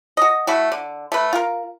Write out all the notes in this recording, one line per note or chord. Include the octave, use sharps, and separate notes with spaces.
F#4 D#5
A3 E4 F#4
D3
A3 B4
F4 A#4